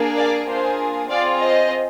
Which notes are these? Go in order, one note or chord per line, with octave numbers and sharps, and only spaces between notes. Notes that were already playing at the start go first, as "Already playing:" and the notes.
Already playing: A#3 D4 G#4
D5 F5
A#3 D4 F4 G#4 C5
C4 F4 G#4 D5 F5
C5 D#5